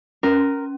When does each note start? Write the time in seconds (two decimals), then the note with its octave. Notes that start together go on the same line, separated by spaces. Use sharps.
0.23 C#4 A#4